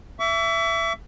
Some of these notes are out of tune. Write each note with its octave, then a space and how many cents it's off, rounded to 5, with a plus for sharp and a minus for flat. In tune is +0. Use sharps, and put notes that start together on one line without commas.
E5 +15 C#6 +45